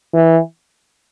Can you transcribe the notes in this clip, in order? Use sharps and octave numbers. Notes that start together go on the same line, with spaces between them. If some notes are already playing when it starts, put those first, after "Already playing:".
E3